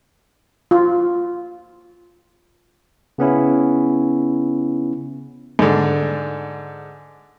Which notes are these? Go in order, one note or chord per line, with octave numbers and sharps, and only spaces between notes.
F4
C#3 B3 C#4 E4
G#2 D3